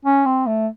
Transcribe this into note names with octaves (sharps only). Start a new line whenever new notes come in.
C#4
C4
A3